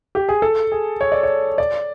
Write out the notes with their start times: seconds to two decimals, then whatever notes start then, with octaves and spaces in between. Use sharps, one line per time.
0.15 G4
0.29 G#4
0.42 A4
0.72 G#4
1.01 C#5
1.12 D5
1.23 C#5
1.58 D5